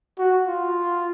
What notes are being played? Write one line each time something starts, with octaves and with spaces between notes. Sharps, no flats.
F#4
F4